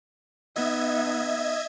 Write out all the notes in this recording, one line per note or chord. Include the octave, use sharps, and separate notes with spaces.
B3 D#4 D#5 E5 G#6